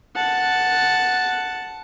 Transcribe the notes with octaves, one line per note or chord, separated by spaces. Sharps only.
F#5 A5